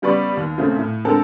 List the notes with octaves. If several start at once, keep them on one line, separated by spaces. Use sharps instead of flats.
C#3 G3 B3 B4 D5 C#6
D#2
A#2 C#3 A3 C4
A2
D3 G#3 C4 A4 A#4